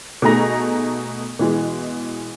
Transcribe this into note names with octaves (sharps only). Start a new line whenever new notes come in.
B2 A3 D#4 G#4 A#5 A#6
B2 E3 G#3